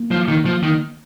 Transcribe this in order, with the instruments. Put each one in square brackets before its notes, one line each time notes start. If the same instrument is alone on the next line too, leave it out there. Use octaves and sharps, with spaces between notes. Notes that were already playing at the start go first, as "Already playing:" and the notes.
Already playing: [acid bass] A#3
[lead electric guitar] F3
D#3
F3
D#3